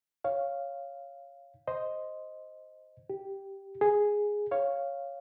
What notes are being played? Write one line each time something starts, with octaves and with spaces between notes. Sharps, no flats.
C#5 F5
C5 D#5
G4
G#4
C#5 F5